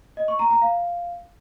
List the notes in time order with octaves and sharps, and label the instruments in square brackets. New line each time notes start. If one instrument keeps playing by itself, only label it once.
[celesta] D#5
C#6
A#5
A#5
F5